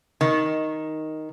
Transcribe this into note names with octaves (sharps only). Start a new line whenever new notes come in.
D#3